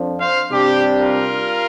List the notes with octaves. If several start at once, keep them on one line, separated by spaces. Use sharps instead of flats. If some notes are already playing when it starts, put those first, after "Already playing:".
Already playing: F2 F3 D4
C5 F5
C3 G3 D4 G4
F4 A#4